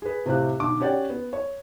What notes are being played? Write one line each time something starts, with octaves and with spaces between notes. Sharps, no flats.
G#4 B4
A2 C3 C4 G4 F5 F#6
B1 D3 D6
C#4 G4 C#5 D5 F#5 G5
B3
C#5